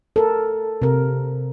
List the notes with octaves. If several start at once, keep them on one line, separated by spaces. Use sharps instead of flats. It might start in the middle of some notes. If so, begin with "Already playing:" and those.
A4 A#4
C3 A#4